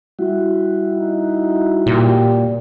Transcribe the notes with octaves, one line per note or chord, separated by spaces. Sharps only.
G3 E4 F#4
D#4
A#2 G4